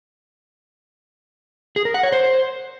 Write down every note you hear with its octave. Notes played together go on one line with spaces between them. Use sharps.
G#4
A#4
F#5
C#5
C5